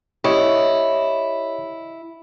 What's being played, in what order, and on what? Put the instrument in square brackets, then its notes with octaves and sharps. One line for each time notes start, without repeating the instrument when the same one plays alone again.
[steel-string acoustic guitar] E4 [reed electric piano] G4 C#5 D#5